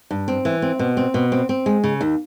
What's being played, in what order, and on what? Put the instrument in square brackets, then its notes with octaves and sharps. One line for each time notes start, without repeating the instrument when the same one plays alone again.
[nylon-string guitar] G2
C4
E3
C4
B2
C4
B2
C4
C4
G#3
C#3
D#2